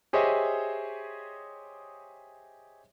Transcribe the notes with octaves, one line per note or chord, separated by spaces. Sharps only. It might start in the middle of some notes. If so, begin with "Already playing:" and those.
G4 G#4 C5 C#5 D#5 E5